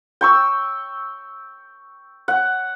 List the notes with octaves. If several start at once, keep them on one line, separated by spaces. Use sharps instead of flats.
G5 C#6 E6
F#5